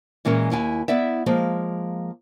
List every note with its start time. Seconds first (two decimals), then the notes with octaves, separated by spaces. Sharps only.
0.25 A#2 E3 G#3 C#4 A#4
0.51 D#2 E4 G#5
0.88 B3 E4 D5 E5
1.26 F3 G#3 A#3